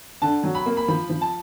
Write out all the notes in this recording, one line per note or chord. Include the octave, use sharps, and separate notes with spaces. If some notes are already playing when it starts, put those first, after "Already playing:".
D3 A5
F#3
B5
A#3
B5
F3 B5
F3
A5